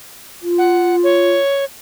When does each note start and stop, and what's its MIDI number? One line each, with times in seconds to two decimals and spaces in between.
0.42 1.32 65
0.58 0.96 78
1.03 1.65 73